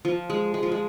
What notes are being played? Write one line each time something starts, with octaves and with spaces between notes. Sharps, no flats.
F3
G#3
G#3
F3
G#3